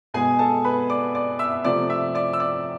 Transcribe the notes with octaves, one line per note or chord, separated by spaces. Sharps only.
B2 G#3 B3 G#4 G#5
A4 A5
B4 B5
D5 D6
D5 D6
E5 E6
C3 F3 A3 D5 D6
E5 E6
D5 D6
E6
D5 D6